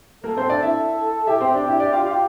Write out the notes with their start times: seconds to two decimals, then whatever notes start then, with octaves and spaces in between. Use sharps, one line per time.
0.24 A#3 A4 A#4
0.37 C4 C5
0.49 D4 D5
0.63 E4 E5
1.27 E4 G4 E5
1.41 C4 C5
1.54 D4
1.67 E4
1.80 D4 D5
1.93 F4 F5
2.05 F4 F5